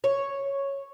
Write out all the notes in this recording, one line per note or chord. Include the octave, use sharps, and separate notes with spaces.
C#5